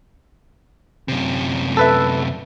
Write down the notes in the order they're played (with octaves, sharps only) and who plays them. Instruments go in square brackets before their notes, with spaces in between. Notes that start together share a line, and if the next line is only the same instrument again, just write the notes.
[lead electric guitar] F#2 C3
[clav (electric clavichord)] A4 B4 E5